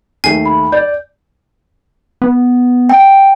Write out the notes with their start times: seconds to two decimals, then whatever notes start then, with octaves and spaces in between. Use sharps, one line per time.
0.24 D#2 A3 G#5 C7
0.46 B5
0.72 D5 G6
2.22 B3
2.89 G5